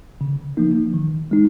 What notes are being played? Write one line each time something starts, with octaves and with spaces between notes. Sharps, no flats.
C#3
F3 A#3 D#4
D#3
G#3 D#4